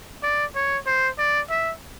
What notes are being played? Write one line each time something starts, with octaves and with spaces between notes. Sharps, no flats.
D5
C#5
C5
D5
E5